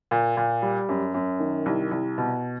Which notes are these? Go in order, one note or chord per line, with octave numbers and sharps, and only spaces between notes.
A#2
A#2
G3
F#2
F#2
D#3
C2
C2
B2